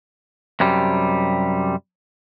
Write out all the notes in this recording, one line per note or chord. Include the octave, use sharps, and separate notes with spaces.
F#2 C3 G3